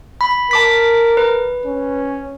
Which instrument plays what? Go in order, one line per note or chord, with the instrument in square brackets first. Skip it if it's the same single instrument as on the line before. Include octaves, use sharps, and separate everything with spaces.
[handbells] B5
[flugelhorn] A#4 [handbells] A5 D6 B6
[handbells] B4
[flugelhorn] C#4